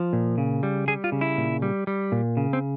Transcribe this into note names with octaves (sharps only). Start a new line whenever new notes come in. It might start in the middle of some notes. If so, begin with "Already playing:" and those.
Already playing: F3
A#2
C#3
G3
G3 G#4
F4
C#3
E4
A#2
G3
G3
A#2
C#3
C4